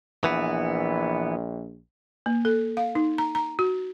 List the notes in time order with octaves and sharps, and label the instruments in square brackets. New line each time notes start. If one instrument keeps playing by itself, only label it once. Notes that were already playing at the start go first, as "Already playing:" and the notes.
[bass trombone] A#1 [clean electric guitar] E3 B3
[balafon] A#3
A4
F5
D#4
A#5
A#5
F#4